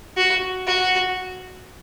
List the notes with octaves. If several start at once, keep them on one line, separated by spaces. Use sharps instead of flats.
F#4
F#4